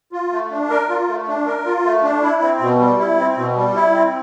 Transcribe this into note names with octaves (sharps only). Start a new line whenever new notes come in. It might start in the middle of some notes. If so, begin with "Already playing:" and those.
F4
A3
D4
A#4
F4
A3
D4
A#4
F4
A3
D4
E4
C4
B2
G3
E4
C4
B2
G3
E4
C4